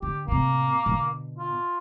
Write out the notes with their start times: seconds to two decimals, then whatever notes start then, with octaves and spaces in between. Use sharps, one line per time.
0.02 D3 G4
0.28 A2 C3 A#3
0.86 B2 D3
1.38 F4